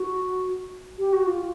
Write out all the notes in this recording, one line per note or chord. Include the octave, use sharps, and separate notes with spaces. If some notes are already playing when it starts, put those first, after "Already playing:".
Already playing: F#4
G4
F#4
F4